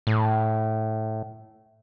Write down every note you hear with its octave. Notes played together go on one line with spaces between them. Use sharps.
A2